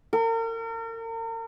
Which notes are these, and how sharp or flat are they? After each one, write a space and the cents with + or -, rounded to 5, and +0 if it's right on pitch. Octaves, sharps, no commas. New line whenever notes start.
A#4 -40